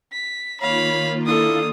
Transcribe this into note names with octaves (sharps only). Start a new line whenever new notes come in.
B6
D#3 A#3 F4 C#5 F5 B5
D4 E4 A4 D#6